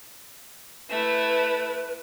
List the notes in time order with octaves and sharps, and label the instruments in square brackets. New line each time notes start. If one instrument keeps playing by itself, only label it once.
[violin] A3 E4 [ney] B4